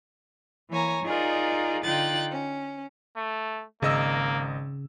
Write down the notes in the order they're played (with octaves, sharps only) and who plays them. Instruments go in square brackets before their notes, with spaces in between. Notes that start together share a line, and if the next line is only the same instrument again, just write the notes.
[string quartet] E3 A#3 C#5 G#5 A#5
D#4 F4 G#4 A#4 D5
D3 D#4 F4 G5 F#6 A6
C#4
[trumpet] A3
[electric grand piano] G#1 D#5 E6 [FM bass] C#3 [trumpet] A#3